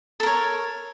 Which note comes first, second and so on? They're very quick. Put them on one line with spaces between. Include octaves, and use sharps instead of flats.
A4 A#4 C#5